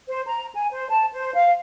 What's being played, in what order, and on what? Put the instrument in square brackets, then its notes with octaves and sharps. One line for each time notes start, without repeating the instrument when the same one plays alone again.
[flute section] C5
A#5
G#5
C5
A5
C5
F5